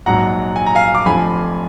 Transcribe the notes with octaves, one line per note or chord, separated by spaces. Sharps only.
A#1 G#2 F#3 F#5 A#5
G#5
A#5
F5 G#5
D6
F1 F2 D3 F3 G#5 B5